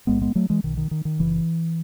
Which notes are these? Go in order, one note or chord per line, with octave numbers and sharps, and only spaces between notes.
B1 A2 G#3 B3
G#3 B3
F#3 A3
E3 G#3
B1 B2 D#3
D#3
D#3
D#3
F#1 F#2 C#3 E3